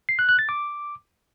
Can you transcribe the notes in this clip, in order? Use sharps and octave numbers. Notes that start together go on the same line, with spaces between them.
C7
F#6
F#6
A6
D6